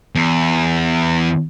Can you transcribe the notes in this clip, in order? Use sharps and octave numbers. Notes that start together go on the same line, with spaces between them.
E2